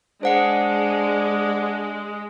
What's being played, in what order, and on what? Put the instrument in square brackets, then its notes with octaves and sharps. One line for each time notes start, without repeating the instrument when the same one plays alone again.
[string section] G#3 [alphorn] D4 [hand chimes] C5 F#5 C#7